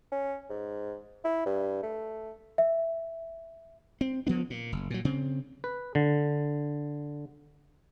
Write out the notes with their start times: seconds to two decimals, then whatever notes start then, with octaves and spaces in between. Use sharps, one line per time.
0.12 C#4
0.49 G#2
1.24 E4
1.46 G2
1.83 A3
2.58 E5
4.01 C4
4.27 D3 F3 B3 D4
4.50 A#2
4.72 F#1
4.90 A#2 F#3
5.05 C#3 C4
5.64 B4
5.95 D3